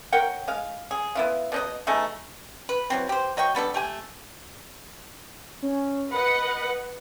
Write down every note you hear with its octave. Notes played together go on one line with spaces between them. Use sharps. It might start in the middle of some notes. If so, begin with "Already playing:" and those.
A#4 C#5 F#5 G5
G#3 F5
G#4
B3 E4 F4
B2 D#4 D#5
B2 A3 D#4 G#4
B4
E3 F#3 C4
G4 C5
F#3 D#5 G5 C#6
G3 B3 D4 A4
A3 G4 G#5
C#4
B4 D#5 F#5 B5